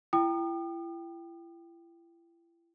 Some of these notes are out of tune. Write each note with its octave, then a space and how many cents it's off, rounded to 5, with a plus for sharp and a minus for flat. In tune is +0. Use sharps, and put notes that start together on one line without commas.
E4 +35 G5 +0 D#6 -45